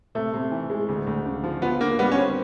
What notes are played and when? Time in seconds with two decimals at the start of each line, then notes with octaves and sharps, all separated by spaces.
0.15 C3 A3
0.33 C3
0.51 E3
0.70 G#3
0.89 D2
1.07 D2
1.26 C#3
1.44 F3
1.62 B3 F4
1.80 D3 A#3
1.99 G3 B3
2.12 C#4
2.18 C4